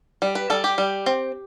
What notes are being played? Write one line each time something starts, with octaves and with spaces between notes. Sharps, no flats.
G3
B4
G3 A4
G4
G3
C4